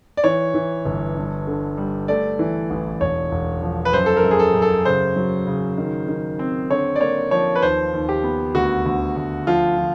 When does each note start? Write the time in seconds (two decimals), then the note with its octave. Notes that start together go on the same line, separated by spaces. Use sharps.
0.17 D5
0.24 E3 C#5
0.54 E3
0.85 G1
1.16 G2
1.47 D3
1.77 G3
2.08 A3 D5
2.39 E3
2.70 A1
3.01 E1 C#5
3.31 E1
3.62 F3
3.85 B4
3.93 F#2 C5
4.06 A4
4.17 A#4
4.24 F#2
4.31 G#4
4.39 A4
4.55 F#2
4.62 A4
4.85 C#3 C5
5.16 F#3
5.47 C#3
5.78 D#3
6.08 D#3
6.39 C4
6.70 D3 C#5
6.96 D5
7.01 A#3 C#5
7.31 F3 C#5
7.56 B4
7.62 D#2 C5
7.93 D#2
8.09 G4
8.24 B3
8.55 D2 F#4
8.86 D2
9.16 D2
9.47 F3 F4
9.78 F3